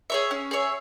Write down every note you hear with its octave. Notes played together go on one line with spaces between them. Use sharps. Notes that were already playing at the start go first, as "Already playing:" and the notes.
G#4 C#5 E5
C#4
G#4 C#5 E5